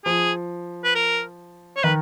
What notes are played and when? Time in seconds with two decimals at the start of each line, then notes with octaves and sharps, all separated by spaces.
0.05 F3 G#4
0.84 B4
0.95 A#4
1.77 C#5
1.84 D#3 B4